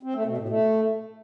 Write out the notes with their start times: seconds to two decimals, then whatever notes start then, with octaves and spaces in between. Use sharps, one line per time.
0.03 C4
0.14 A3
0.26 B2
0.37 A2
0.49 A3